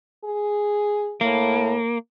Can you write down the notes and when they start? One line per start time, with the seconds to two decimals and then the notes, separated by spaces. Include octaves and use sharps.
0.24 G#4
1.21 A2 A#3